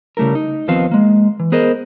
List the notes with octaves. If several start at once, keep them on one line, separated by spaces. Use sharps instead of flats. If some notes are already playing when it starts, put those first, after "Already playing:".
C#3 G3 A3 E4 A#4
D#4
D#2 D#3 F3 B3 C4 F5
G#3 A#3
E3
B3 G#4 A#4 C5 D#5